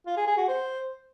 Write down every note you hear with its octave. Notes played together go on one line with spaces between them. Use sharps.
F4
G#4
G#4
F#4
C5